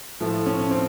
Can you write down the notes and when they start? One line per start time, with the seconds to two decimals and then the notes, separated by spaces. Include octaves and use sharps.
0.20 A2 F3 A3
0.46 C#4
0.59 C#4
0.71 C4